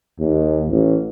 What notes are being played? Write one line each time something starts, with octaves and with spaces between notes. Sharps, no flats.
D#2
A1